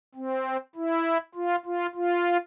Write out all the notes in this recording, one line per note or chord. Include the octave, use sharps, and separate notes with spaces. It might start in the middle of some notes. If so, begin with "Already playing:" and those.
C4
E4
F4
F4
F4